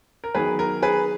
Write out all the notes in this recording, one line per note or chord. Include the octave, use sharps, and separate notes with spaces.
A#4
D#3 F#3 B3 G#4 B4
A#4
G#4 B4